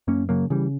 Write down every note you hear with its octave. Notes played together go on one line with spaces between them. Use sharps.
F#2 A#3 C#4
C#3 F#3 A#3
C#3 E3 G3